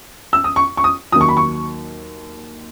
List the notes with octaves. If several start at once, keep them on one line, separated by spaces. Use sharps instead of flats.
E6
D#6
C#6
C#6
D#6
D#2 D#3 F#3 D#6
C#6
B5
C#6